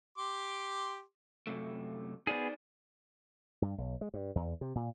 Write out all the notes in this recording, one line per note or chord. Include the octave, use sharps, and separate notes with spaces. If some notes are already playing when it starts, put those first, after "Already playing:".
G4 C6 D6
F#2 C3 A3
B3 D#4 G#4 C5 D5
G2
B1
G#3
G2
E2
C3
A#2